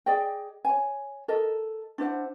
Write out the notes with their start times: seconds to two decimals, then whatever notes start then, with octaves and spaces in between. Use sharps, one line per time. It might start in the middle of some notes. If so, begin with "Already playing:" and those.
0.06 G#4 D5 D#5 G5
0.65 C#5 G#5
1.28 A4 A#4 D#5
1.98 D4 E4 C5 F#5